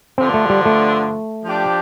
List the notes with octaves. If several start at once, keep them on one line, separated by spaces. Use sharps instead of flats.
G2 D3 F3 C4 D4
A3
G3
A3
F3 D4 G4